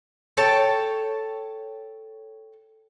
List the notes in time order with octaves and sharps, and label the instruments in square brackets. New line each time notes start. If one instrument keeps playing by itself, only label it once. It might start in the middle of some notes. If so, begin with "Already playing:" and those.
[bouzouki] A4 C#5 G5 A5